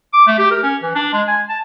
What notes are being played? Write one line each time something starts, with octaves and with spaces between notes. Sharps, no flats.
D6
A3
G4
A#4
C#4
E3
D4
G#3
G#5
A5